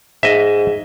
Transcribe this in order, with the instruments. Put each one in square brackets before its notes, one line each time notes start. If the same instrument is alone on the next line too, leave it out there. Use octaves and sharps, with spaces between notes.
[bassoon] G#2 [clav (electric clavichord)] D#5 E5